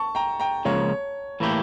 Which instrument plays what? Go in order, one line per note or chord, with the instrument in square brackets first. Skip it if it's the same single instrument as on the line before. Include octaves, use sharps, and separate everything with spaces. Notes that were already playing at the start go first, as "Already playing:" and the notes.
Already playing: [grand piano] A5 C#6
G5 A#5
G5 A#5
[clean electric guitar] C#2 C#3 F3 A#3 [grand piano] C#5
[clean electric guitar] A2 E3 A#3 E4 G4